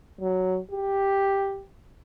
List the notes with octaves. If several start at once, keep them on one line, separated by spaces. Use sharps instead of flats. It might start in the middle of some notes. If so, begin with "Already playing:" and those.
F#3
G4